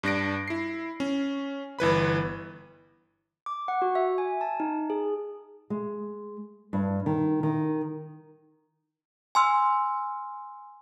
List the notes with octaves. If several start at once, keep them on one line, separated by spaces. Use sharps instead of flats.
G2 D4 A#6 D7
E4 C7
C#4
G1 E3 B4 B5
D6
F#5
F#4
E5
G#5
A5
D#4
G#4
G#3
G2
D#3
D#3
G#5 C6 E6 F6